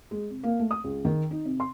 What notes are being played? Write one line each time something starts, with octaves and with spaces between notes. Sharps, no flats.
G#3
C3
A#3
A3
D#6
C#2
D#3
D#4
C3
C6